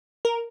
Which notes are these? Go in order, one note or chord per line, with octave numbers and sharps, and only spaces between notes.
A#4